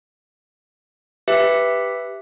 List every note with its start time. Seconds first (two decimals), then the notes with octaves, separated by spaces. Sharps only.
1.28 G4 B4 E5